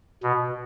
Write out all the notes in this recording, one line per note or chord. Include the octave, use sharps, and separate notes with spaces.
B2